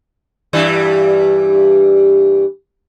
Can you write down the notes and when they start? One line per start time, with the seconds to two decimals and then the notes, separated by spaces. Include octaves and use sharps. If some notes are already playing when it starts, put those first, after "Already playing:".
0.53 G2 E3 G3